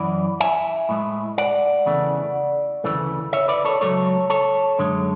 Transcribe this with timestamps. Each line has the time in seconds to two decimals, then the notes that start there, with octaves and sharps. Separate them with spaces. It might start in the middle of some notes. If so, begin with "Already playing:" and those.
Already playing: F#2 E3 D5 F#5
0.40 E5 G#5
0.89 A2 G#3
1.38 D5 F#5
1.86 E2 C#3 E3 A3
2.84 D2 C#3 E3 A3
3.33 C#5 E5
3.48 B4 D5
3.65 A4 C#5
3.81 C#2 C#3 F#3 A3 A4 C#5
4.30 A4 C#5
4.79 F#2 D3 G#3